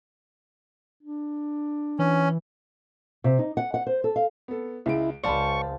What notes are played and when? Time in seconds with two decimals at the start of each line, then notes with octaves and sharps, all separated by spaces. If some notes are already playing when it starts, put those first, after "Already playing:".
1.03 D4
1.99 E3 C#4
3.24 C3
3.39 D#4
3.57 F#5
3.74 F#5
3.87 C5
4.04 A4
4.16 F5
4.48 B3 A4
4.86 C#2 G#3 E4 D7
5.24 C#2 C5 D5 F5 A5 B5 C#6